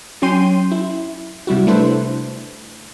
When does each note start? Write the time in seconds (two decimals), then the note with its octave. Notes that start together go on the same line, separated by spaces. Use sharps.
0.22 F#3 C#4 G5 C6 D#7
0.71 E4
1.47 C3 G3 E4 F#4
1.67 A3 D4 E4 A4 B4 C5